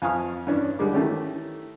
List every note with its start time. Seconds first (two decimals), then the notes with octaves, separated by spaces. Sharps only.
0.02 F2 F5 G#5 C#6 D#6 F6
0.47 G2 E3 C#4 D4
0.79 D#2 D3 G3 G#3 D6
0.93 D#3 E3 A3 C#4 G4